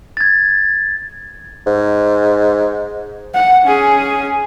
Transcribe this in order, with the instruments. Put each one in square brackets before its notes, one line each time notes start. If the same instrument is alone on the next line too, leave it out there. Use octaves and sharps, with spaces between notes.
[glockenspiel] G#6 A6
[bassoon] G#2
[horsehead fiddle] F#5
C#4 G#4